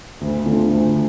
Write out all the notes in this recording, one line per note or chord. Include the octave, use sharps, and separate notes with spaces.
D2
D3 A3 F4
D2